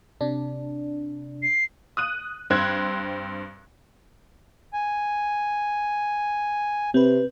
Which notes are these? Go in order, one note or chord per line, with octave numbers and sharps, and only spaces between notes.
C3 D4
C7
D#6 F#6 D#7
G2 C4 F#6 G#6
G#5
C3 C4 B4